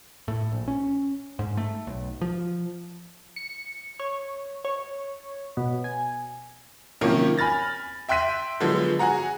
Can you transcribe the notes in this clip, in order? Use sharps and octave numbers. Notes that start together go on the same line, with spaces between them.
A2
A#1
C#4
G#2
A3
B1
F3
C#7
C#5
C#5
B2
G#5
C3 D#3 F3 F#3 A#3 C#4
G#5 B5 F6 A6 A#6
E5 G5 C6 F#6 B6 D#7
D3 F3 F#3 G#3 B3
F#4 G#4 F#5 A#5